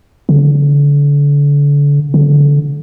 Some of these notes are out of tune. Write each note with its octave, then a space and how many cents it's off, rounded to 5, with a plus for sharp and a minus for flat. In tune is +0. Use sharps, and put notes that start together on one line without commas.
D3 -35
D3 -25